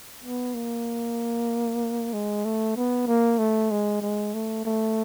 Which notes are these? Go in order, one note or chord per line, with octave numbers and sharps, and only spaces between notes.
B3
A#3
G#3
A3
B3
A#3
A3
G#3
G#3
A3
A3